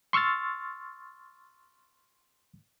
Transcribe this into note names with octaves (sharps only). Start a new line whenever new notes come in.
C6 C#6 E6 F6 A6